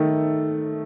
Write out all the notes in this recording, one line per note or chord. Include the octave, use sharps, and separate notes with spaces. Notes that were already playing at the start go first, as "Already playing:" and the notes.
Already playing: D#3 A3